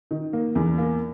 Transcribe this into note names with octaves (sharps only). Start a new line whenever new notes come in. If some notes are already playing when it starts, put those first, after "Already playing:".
D#3
A#3
E2
A#3